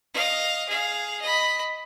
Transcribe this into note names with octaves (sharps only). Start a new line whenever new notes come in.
D#5 F5
G#4 F5
D#5 B5